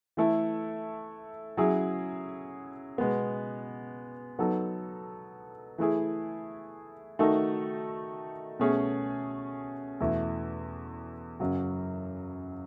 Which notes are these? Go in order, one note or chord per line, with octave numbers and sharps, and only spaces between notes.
E3 A3 E4 A4
F#3 C#4 E4 G#4
B2 G#3 B3
F#3 B3 D#4 A4
E3 A3 E4 G#4
D#3 A3 D#4 F#4 A4
B2 A3 C#4 G#4
E2 B2 A3 E4
F#2 C#3 F#3